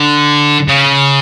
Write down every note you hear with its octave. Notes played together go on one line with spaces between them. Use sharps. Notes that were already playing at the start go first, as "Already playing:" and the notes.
Already playing: D3
C#3